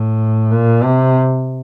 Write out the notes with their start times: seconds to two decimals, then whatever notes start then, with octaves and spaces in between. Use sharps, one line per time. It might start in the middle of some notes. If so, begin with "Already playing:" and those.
Already playing: A2
0.51 A#2
0.83 C3